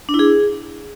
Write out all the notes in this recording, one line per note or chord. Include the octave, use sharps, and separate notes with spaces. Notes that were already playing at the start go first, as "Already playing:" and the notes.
D4
E4
G#4